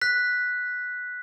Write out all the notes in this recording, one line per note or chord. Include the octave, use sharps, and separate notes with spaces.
F#6 B6